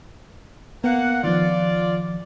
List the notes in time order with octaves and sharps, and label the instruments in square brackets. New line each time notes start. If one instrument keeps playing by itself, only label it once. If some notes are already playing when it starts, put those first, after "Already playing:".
[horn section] A#3 F#5 [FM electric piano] B3
[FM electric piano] D#3 F3 [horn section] F4 D5